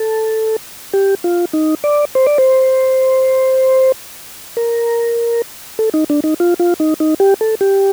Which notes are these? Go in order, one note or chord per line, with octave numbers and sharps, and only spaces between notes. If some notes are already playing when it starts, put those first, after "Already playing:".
Already playing: A4
G4
F4
D#4
D5
C5
D5
C5
A#4
A4
D#4
D4
D#4
F4
F4
D#4
D#4
G4
A4
G4